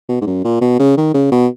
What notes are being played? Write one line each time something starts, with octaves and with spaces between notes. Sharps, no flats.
B2
G#2
F#2
A#2
B2
C#3
D#3
C#3
B2